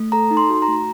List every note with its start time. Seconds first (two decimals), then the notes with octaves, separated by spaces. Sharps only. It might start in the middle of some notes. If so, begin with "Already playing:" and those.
Already playing: A3
0.12 A4 A#5
0.31 D#4
0.37 C6
0.50 F#4
0.62 A#5
0.68 A3